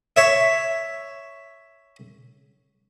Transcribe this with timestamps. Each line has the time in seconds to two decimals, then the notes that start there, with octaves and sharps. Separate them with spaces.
0.16 C#5 E5